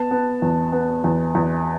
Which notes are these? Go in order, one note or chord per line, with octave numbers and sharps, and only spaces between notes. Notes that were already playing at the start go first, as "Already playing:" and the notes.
Already playing: B3 A5
B3
E2
B3
E2
E2